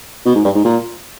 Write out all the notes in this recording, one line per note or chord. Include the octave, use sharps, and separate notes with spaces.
B2
G#2
G2
G#2
A#2